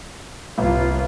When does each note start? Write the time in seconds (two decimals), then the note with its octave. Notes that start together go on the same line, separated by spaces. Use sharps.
0.58 G1 C2 F4